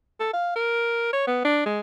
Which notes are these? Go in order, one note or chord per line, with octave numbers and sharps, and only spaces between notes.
A4
F5
A#4
C#5
B3
D4
G#3